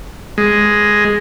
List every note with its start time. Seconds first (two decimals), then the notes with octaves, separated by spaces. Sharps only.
0.38 G#3